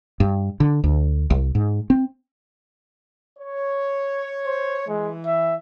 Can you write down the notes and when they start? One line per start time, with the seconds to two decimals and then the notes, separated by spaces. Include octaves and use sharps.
0.20 G2
0.60 D3
0.84 D2
1.30 C2
1.55 G#2
1.90 C4
3.39 C#5
4.46 C5
4.88 E3 G#3
5.26 E5